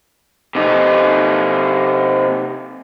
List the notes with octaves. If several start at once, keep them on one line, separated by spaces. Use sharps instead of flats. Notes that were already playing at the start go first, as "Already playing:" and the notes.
C3 D#4